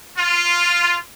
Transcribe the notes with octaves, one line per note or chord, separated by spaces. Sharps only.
F4